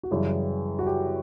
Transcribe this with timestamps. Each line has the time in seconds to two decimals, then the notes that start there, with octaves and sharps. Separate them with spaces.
0.03 F#4
0.11 F#2 C#3 E3 G3 G4
0.79 F#4
0.86 G4